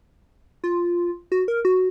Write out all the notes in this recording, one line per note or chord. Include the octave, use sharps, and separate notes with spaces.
F4
F#4
A#4
F#4